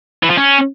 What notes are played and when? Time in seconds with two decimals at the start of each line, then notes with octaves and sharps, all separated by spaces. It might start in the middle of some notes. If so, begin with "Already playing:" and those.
0.23 E3
0.30 F3
0.37 C#4